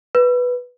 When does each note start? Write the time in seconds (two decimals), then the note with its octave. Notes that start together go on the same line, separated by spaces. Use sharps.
0.15 B4